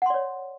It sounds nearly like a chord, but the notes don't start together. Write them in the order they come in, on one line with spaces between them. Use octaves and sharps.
F#5 C6 D5 C#5